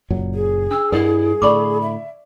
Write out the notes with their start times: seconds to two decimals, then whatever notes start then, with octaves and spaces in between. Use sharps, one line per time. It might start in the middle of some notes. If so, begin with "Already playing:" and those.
0.10 F#1 A#2 F#3
0.35 G#4
0.71 D4 E6
0.92 G2 E4 A#4 D#5 F#5
1.42 A2 D3 D5 B5 C#6 D6
1.81 E5